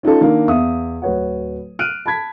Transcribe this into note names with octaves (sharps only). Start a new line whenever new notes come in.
C#4 D#4 F4 A4
D#3 A#3 D4
E2 E5 F5 D#6
D1 B4 C#5 F#5
F6 F#6 D7 D#7
A5 B5 G#6 B6